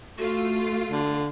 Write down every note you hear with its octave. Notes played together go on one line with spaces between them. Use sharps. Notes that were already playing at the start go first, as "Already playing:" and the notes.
A3 F4 F#4
D3